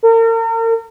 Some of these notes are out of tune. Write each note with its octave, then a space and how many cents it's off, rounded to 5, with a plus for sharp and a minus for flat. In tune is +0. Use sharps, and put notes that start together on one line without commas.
A#4 -40